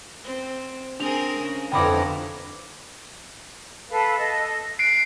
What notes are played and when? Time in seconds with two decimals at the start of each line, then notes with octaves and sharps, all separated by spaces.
0.24 C4
1.00 C4 D4 G#4 A#4 F7
1.41 C#3
1.72 G1 F2 D#4 E4 D5 G5 B5 D6
3.90 A4 B4 F5
4.16 A4 D#5
4.79 F#6 C7 D7